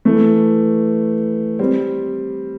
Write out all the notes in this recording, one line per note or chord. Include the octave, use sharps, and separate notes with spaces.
E3 A3
G3 C4